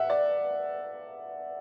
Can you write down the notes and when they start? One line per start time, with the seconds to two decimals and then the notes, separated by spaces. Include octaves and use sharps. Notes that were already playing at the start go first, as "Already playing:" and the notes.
Already playing: E5 F#5
0.10 D5